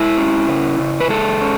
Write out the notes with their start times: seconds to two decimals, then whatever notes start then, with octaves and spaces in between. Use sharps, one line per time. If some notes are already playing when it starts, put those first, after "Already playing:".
Already playing: G#3 E4
0.18 C#4
0.48 C#3
0.79 C#3
1.00 B4
1.09 G#3 A4
1.41 C#4